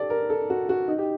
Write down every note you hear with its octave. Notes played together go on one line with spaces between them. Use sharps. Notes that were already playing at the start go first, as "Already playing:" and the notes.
Already playing: G4 A4 D5
A#4
A4
F#4
F#4
D#4
G4